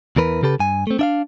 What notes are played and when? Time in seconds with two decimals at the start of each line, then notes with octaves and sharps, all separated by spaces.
0.16 E2 E3 A#4 B4
0.43 C#3 G4 A4 B4
0.60 G2 G#5
0.87 A3 C4
0.99 D4 E5 F5